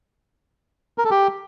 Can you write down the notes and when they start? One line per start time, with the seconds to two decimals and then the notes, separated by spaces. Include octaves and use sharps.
0.98 A#4
1.04 A4
1.11 G4